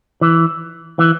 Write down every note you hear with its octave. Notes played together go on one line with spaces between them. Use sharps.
E3
E3